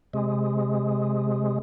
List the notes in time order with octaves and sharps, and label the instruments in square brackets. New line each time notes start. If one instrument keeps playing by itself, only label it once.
[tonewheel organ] C3 G#3